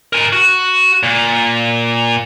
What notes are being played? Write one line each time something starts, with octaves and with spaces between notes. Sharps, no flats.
A#4 G#5
F#4
A#2